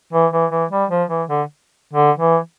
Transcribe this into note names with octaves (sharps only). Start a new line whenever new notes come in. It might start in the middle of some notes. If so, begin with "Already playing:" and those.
E3
E3
E3
G3
F3
E3
D3
D3
E3